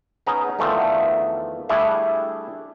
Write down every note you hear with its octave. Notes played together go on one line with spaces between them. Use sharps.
B3 C#4 D#4 G#4 B4 A#5
E2 D3 D#3 F3 A3
G3 A3 D4 E4 G#4 E5